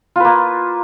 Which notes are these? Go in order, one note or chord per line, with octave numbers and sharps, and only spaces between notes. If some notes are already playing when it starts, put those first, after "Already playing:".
A#3 F4 B4